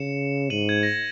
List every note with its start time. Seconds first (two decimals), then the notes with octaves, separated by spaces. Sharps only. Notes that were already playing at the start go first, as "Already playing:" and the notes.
Already playing: C#3 C#7 E7
0.50 G#2 D#7 F#7
0.69 G#6
0.83 A#6